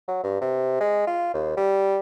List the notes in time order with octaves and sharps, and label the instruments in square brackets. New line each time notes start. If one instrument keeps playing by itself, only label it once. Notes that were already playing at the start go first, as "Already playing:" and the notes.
[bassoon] F#3
G2
C3
G#3
F4
D#2
G3